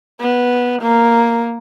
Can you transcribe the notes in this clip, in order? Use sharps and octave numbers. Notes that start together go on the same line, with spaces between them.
B3
A#3